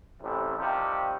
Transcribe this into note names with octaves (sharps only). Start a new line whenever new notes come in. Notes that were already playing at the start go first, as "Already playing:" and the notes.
A1 C3
C3 D#3 F3 G3